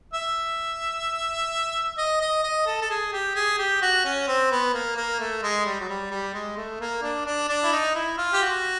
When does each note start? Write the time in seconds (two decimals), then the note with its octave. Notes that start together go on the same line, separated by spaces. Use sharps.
0.14 E5
1.98 D#5
2.21 D#5
2.43 D#5
2.66 A4
2.81 A4
2.90 G#4
3.13 G4
3.35 G#4
3.58 G4
3.82 F#4
4.05 C#4
4.27 C4
4.51 B3
4.73 A#3
4.96 A#3
5.20 A3
5.43 G#3
5.65 G3
5.80 F#3
5.89 G3
6.11 G3
6.34 G#3
6.57 A3
6.80 A#3
7.03 D4
7.26 D4
7.49 D4
7.64 E4
7.72 D#4
7.95 E4
8.18 F4
8.33 G4
8.42 F#4